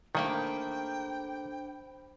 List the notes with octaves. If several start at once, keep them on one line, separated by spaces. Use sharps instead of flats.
D#3 A3 A#3 D4 G4 C5 G5 B5